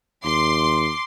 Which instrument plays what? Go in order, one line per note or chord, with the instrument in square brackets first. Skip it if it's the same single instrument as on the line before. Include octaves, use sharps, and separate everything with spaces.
[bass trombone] D#2 [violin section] C6 [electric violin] D6